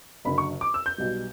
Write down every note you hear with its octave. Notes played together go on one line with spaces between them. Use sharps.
F#1 F#2 D3 B5
C#6
D6
E6
G6
B1 B2 G3